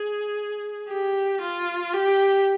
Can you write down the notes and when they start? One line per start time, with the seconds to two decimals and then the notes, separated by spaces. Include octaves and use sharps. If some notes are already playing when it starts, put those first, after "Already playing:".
Already playing: G#4
0.88 G4
1.41 F4
1.93 G4